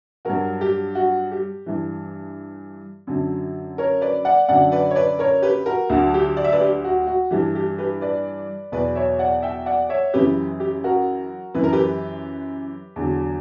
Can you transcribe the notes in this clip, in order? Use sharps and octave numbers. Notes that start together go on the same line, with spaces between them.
G2 F#3 F#4 A#4
G4
F#4
G4
G2 E3
F#2 D3 F#3
A#4 C#5
B4 D5
D5 F#5
F#2 D3 F#3 D5 F#5
B4 D5
C#5
B4 D5
A#4 C#5
G4 B4
F#4 A#4
D2 D3 F#3 F#4
G4
D5
E5
B4 D5
G4
F#4
F#4
G2 E3 G4
G4
G4 B4
B4 D5
E2 B2 F#3 B4 D5
C#5 E5
D5 F#5
E5 G5
D5 F#5
C#5 E5
F#2 C#3 E3 G4 B4
G4
F#4 A#4
F#2 E3 B4
A#4
G4 B4
E2 D3 F#3